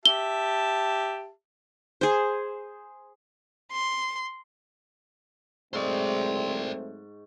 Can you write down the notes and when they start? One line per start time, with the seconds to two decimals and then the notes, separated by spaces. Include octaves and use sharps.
0.06 G4 E5 A5 G7
2.01 G#4 C5
3.72 C6
5.73 G#2 F#3 A3 C4 C5 D5 C#6